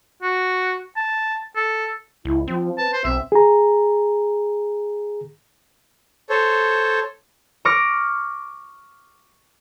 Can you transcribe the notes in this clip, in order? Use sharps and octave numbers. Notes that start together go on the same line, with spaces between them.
F#4
A5
A4
C#2 E4
F3 C4
B4 A5
C5
B1 C4 E5
G#4 A#5
A4 C5 C#5
C#6 D6 F6 A#6 D7